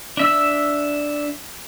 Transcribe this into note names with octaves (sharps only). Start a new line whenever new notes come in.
D4 E5 E6